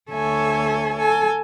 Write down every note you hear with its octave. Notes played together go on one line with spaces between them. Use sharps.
D2 A4 C#5 E5 G#5
A4 G#5